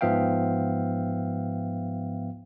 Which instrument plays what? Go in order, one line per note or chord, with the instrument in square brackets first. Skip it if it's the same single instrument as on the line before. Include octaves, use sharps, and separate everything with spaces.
[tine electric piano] G#2 F3 B3 E5 F5 G5